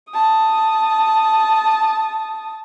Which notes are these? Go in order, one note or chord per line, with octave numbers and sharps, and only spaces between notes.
A5 D#6